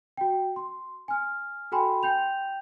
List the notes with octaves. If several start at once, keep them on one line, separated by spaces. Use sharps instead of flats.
F#4 G5
C6
G#5 F6
F#4 A4 G5 G#5 B5 C6
G5 G6 F7